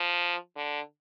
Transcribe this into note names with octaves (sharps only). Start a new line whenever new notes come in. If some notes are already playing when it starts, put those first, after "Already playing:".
Already playing: F3
D3